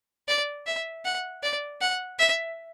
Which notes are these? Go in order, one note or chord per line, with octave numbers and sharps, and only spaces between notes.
D5
E5
F#5
D5
F#5
E5